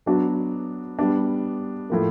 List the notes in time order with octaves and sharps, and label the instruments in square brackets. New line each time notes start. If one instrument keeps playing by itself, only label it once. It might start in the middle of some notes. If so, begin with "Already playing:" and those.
[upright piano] F#3 B3 D4 F#4
G3 B3 D4
A2 F3 A#3